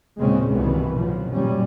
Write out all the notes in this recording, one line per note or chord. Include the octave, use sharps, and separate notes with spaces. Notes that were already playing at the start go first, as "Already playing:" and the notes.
D#2 A#2 C#3 G#3 C4 C#4
C2 G2 B2 D#3 E3 B3
G#2 B2 D#3 F3 F#3
F#2 A#2 G3 C#4